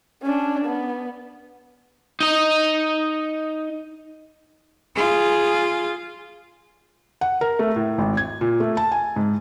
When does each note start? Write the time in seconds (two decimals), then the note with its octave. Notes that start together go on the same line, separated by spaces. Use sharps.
0.22 C#4 D4
0.65 B3
2.20 D#4 D#5
4.96 F4 G#4
7.21 F#5
7.41 A#4
7.59 A3
7.76 A2
7.98 G#1
8.17 G#6
8.41 A#2
8.60 A3
8.77 A5
8.92 G#5
9.16 G#2